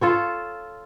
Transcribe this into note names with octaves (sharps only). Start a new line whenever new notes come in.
F4 A4 C#5